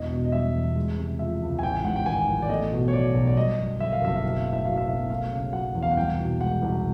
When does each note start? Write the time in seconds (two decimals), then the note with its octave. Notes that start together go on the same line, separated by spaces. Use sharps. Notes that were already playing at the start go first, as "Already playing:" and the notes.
Already playing: E1 E2 D#5
0.12 B2
0.25 D#5
0.32 G3 E5
0.55 E2
0.76 G#3
0.97 C3
1.19 F3 E5
1.42 C#2
1.59 G#5
1.62 A1 G5
1.84 G#2 F#5
1.96 G5
2.06 D#3 G#5
2.28 A1
2.42 D5
2.49 A3 D#5
2.72 B2
2.88 C#5
2.93 F#3 D5
3.14 B1
3.27 D5
3.37 G3 D#5
3.59 F#2
3.79 D3 E5
3.93 F5
4.01 F#1 E5
4.16 F5
4.23 B1
4.29 E5
4.41 A2 F5
4.53 E5
4.65 F#3 F5
4.77 E5
4.88 B1
5.10 A3 F5
5.32 C#3
5.53 F#3 F#5
5.75 E2
5.83 F5
5.91 F#5
5.96 C2 G5
6.19 B2
6.39 G#3 F#5
6.62 C2